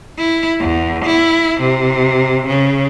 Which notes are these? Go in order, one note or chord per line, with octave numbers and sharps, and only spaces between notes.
E4
E2
E4
C3
C#3